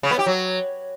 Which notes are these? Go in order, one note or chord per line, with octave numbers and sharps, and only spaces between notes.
C#3
B3
G4
F#3